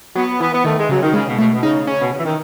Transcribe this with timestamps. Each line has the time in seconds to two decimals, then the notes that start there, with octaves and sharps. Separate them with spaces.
0.16 F#3 B3
0.40 E3 B3
0.53 B3
0.64 D#3 A3
0.77 G#3
0.89 C#3 F#3
1.01 D#3
1.13 C#3 G#3
1.26 B2
1.38 B2 A3
1.52 B2
1.63 C#3 D#4
1.87 C#3 C#4
1.99 B2
2.11 C#3
2.19 E3
2.24 D#3